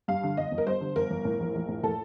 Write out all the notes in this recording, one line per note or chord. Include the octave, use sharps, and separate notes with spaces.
G2 F5
D3
G1 D#5
G1
A#4
G2 C5
D3
G1 A#4
G1
A2
A#1
A#1
A2
A2 A4